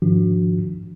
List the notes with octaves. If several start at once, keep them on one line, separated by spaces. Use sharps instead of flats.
G#2 D#3 F3 D4 F#4